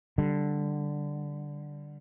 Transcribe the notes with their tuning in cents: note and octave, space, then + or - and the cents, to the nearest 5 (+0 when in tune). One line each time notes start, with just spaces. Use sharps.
D3 +0 G3 -5